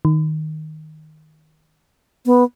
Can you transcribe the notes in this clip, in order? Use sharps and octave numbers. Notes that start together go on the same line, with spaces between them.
D#3
B3